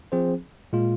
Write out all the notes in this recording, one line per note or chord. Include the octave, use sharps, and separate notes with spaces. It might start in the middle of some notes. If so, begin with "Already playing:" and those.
F3 C4 G#4 C5
A#2 G#3 F4